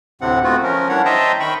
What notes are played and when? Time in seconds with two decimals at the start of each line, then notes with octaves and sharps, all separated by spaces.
0.21 D2 A2 C3 C4 F#5
0.44 A3 B3 C4 F4 F#4
0.63 F3 C#4 A#4
0.89 E3 G3 D4 C#5 F#5
1.05 C5 D#5 E5 G5 A5 A#5
1.40 D#3 G5 B5 C#6